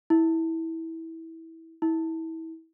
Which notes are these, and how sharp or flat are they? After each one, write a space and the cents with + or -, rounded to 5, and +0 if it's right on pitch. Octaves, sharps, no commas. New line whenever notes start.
E4 -20
E4 -30